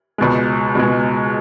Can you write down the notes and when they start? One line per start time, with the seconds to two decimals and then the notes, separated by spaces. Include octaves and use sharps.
0.18 C#2 B2 G#3
0.75 C#2 B2 G#3